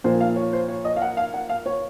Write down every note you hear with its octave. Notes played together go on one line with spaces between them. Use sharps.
A#2 F3 C5
F5
C#5
C5
C#5
D#5
F5
F#5
F5
F#5
F5
C#5